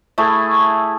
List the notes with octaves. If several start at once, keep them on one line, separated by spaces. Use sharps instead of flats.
A3 E4 G#4